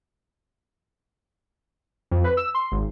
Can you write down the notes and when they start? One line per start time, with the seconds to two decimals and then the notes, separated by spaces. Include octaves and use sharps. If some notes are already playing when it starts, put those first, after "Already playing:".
2.11 F2
2.24 B4
2.37 E6
2.54 C6
2.72 G#1